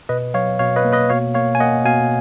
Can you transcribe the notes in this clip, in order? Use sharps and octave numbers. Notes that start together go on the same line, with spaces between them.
B2 B4 D#5
F#3 C#5 F5
B2 C#5 F5
B4 D#5
A#3
B4 D#5
B2 C#5 F5
A#3 C#5 F5
G#5
A#3 D#5 F#5
B2 F5 G#5